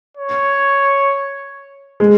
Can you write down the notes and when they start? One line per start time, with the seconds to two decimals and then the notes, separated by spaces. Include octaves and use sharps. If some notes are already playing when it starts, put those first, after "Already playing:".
0.17 C#5
2.00 G#3